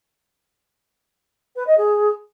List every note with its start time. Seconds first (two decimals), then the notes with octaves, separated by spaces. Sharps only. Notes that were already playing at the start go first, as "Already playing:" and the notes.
1.56 B4
1.67 D#5
1.78 G#4